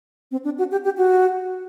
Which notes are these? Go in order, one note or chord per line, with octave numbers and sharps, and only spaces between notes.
C4
D4
F#4
G4
G4
F#4